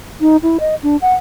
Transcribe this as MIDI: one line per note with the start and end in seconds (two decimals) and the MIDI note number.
0.21 0.37 63
0.43 0.58 64
0.60 0.75 75
0.83 0.97 62
1.02 1.14 78